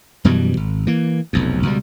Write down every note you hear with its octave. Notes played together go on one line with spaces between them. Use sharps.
F#2 B2 E3 G3
G#1
E3 A#3
F1 B1 F2
C#2 B2 G3